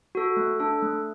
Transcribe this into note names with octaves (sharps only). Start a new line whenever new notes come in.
F#4 A4
A3
D4 A4
A3